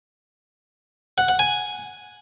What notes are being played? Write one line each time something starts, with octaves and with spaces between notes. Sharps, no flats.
F#5
F#5
G#5